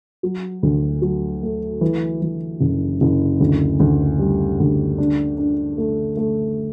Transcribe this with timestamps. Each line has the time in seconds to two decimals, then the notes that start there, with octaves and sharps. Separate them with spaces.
0.23 F#3
0.63 D2
1.02 F#3
1.43 A3
1.81 E3
2.22 E3
2.60 F#1
3.01 F#1
3.40 D2
3.80 D2
4.19 G3
4.60 D2
4.98 D4
5.38 D4
5.78 A3
6.17 A3